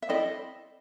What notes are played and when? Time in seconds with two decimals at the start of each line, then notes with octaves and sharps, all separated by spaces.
0.02 E5
0.09 C4 E4 A4 D5 D#5